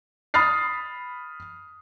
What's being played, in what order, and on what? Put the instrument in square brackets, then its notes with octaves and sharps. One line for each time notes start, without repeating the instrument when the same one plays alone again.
[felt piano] B5 D#6 F6 A6 C7